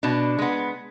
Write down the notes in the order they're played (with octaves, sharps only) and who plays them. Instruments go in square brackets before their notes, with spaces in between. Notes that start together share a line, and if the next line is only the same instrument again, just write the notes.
[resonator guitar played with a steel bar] B2 D4
G#3 B3